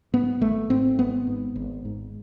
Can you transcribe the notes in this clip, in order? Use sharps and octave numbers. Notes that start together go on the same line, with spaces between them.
G#2 B3
G#1 A3
G#2 C4
G#1 B3
G#2
G#1
G#2